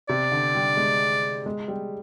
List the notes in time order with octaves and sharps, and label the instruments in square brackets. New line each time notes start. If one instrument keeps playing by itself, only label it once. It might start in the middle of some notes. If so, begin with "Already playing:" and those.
[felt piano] C3 [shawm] D5
[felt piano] D3
G3
G#3
G#3
G3